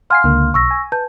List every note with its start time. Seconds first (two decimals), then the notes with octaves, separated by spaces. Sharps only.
0.10 F5 F#5 G#5 C6 F6 C7
0.24 C#2 D3 A#3
0.54 B1 C#6 E6 A#6
0.71 G#5
0.92 B4 A5 G6